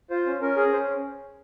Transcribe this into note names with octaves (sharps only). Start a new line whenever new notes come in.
F4 C5
C#4
C#4 A#4
G#4
C#4 C5